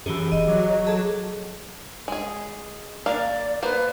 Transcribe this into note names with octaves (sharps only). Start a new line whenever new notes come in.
F#2 E3 G4 G#4
E1 D#5
F#3 D6
G#4 A4 A5
G#3 G#4
A#3 D5 F5
A#3 B3 B4 C5